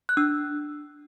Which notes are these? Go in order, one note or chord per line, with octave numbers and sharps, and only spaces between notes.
F#6
D4 E6